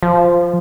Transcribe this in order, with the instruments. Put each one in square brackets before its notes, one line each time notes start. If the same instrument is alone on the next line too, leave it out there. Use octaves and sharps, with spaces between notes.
[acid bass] F3